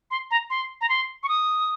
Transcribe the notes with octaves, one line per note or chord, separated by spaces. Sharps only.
C6
A#5
C6
A#5
C6
C#6
D#6